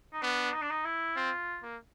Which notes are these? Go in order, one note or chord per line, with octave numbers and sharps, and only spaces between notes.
D#4
B3 D4
D#4
D4
D#4
E4
C4 F4
A#3